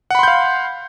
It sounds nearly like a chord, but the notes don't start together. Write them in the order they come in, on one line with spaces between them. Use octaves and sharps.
F#5 B5 C6 G6 F5